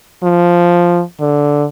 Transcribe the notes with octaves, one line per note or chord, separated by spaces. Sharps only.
F3
D3